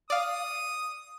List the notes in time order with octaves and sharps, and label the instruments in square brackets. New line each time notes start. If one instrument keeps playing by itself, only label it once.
[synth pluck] D5 F5 [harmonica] D#6